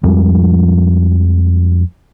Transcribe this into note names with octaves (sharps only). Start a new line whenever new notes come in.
F2 F3 G3 G#3